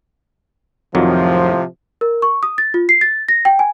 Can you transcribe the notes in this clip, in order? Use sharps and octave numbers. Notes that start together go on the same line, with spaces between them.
F2 A2 C3 D#3 F3 F#3
A#4
C#6
D#6
A6
F4
C7
A6
A#6
G5
G#5